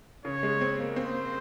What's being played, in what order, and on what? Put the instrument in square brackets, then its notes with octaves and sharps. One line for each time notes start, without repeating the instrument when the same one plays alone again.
[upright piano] C#3 [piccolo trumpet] C#5
[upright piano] G#3
C4
A#3
[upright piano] C4 [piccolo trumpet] C5